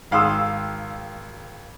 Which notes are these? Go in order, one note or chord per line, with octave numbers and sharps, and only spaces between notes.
G#1 F5 G5 C6 D#6 E6